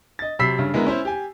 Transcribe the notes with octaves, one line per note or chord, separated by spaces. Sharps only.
D#5 A6
C3 F#3 B5 E6 B6 C7
G2 C#3
D3 G#3 A#3 B3 E4 A#4
C#4 E4 C5
G4 G#5